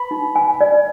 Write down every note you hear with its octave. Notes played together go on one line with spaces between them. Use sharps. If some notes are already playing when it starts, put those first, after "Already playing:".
Already playing: B4 B5
D#4
G#5
D5